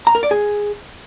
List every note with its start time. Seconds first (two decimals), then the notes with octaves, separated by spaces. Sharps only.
0.07 A#5
0.15 A#4
0.23 D5
0.31 G#4